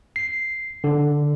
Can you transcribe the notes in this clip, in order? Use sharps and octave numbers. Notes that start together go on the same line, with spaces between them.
C7
D3